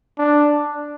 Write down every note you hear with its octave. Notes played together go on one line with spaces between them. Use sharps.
D4